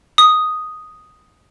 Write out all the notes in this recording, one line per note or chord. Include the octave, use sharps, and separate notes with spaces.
D#6